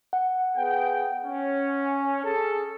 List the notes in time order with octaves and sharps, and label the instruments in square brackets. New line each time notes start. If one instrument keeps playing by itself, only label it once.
[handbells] F#5
[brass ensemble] B3 G#4 G5
C#4
G#4 A4